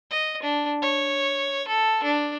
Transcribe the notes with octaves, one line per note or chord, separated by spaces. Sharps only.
D#5
D4
C#5
A4
D4